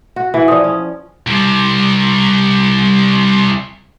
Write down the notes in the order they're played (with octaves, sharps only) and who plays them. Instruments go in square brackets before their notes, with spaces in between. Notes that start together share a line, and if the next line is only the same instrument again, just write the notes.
[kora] F#4
E3
[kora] F3 [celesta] D5 D#6
[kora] C#4
[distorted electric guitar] C2 C3